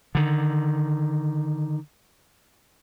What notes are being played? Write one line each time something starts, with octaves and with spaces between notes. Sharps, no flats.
D3 D#3